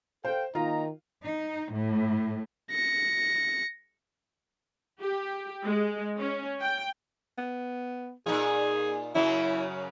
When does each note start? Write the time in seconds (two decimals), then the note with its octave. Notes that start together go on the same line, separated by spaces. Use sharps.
0.25 A4 C5 F5 G5
0.55 D#3 A#3 D#4 F4 A#5
1.24 D#4
1.73 A2
2.71 A#6 C#7
5.01 G4
5.65 G#3
6.19 C#4
6.62 G5
7.38 B3
8.26 A#2 D#4 F4 G#4
9.15 F#2 C#3 F#3 E4